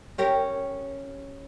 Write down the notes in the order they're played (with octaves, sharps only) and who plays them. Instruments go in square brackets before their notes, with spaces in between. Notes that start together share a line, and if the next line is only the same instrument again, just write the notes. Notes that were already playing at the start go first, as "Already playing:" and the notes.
[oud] C#4 G4 A#4